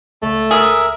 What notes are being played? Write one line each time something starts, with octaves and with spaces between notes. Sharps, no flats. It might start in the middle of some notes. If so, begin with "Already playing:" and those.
C#2 A3
G#4 A#4 E5